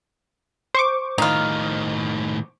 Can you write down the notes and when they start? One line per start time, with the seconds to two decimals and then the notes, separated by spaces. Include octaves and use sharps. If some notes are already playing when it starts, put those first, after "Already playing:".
0.74 C5 C#6 D6
1.18 A2 D#3 D#4 F4